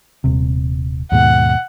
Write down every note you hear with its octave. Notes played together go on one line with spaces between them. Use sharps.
D#1 C3
D#2 G#2 B2 F#5